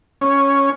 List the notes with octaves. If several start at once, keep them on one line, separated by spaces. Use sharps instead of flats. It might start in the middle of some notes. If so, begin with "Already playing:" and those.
C#4